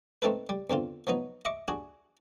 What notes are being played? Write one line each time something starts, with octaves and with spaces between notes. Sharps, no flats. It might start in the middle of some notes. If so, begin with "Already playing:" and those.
A3 C4 D#4 A4 B4
G3
E2 D3 C4 F4
F3 F#3 B3 D#4
D#5 E5 C#6 D6
D4 F#4 G#4